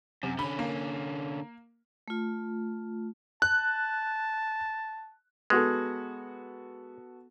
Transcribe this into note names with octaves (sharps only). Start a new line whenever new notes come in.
F#2 C3
D3 C#4 B5
A#3
A3 F4
A5 F#6
G#3 B3 F#4 A4